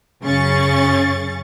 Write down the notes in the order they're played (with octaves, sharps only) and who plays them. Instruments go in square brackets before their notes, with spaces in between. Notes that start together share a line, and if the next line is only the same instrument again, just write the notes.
[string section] F#2 C#3 C#4 G#4 C#6 A6